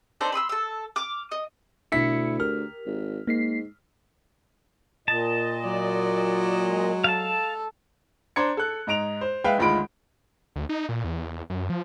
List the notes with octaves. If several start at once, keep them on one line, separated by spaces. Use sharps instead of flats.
D4 D#4 A4 C5
B5 C6 D#6 E6
A4 E6
D6 F6
D#5
D2 B2 D4 E4 B6 C#7
G4 A#4 F6
G#1
G#2 A#3 B6 C7
A#2 D#5 A5
F#3 D5
G#3
A4 F5 A5
D4 C5 A#5 C6 G#6 C#7
A4 F#6
G#2 D#4 A#5 D7 F7
C5
G#3 B4 E5 F5 G5
G#1 D2 G#3 F4 B5 D7
D2
D#4
A#2
E2
F#2
F3